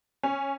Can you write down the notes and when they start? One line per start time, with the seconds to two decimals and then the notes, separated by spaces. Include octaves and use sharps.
0.23 C#4